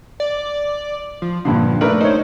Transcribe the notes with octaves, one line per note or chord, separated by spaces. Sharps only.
D5
F3
G2 A#2 D3 F3
A3 D4 A#4 B4
D#4 C5 C#5